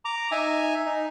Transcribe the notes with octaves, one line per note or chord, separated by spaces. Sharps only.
A#5 D6
D#4 E5 G#5
D#4